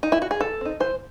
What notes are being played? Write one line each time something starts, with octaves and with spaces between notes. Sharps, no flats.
D#4
E4
F#4
G#4
E3 A4
C4 D#4
E3 C5